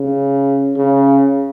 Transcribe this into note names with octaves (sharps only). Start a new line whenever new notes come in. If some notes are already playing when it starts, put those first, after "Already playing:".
Already playing: C#3
C#3